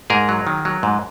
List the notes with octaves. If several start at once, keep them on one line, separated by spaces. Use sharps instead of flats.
G#2 G#4 A#4
F#3
D#3
F#3
G#2